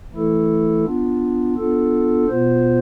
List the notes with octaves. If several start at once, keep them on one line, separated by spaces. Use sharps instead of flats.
E3 A3 E4 A4
B3 D4 F4
B3 D4 F4 A4
B2 B3 F4 C5